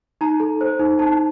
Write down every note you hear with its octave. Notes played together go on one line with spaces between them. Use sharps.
D#4 A#5
A4
C5
D#4
D#4 A5